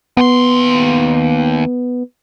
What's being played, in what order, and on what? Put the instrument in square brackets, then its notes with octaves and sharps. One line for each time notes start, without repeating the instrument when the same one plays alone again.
[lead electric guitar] D#2 C6 [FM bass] B3